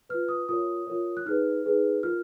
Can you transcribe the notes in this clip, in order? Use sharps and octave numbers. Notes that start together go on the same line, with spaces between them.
F4 B4 F6
D#6
F4 A#4 C#5 D#6
F4 A#4 C#5
F#6
D#4 G#4 B4 F6
D#4 G#4 B4
F4 A#4 F6